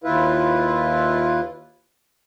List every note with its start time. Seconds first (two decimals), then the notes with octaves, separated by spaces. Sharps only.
0.04 D#2 E4 F4 B4